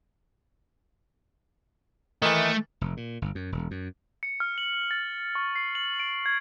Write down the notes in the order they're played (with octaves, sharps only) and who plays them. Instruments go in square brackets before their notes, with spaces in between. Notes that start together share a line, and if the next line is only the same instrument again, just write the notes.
[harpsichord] D#3 E3 [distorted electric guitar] A3
[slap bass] F1
A#2
G1
F#2
E1
F#2
[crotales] C#7
F6
F#7
A6
C#6
C7
F#7
D7
G#6